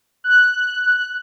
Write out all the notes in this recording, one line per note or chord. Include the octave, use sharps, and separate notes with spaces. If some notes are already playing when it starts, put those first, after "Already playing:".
F#6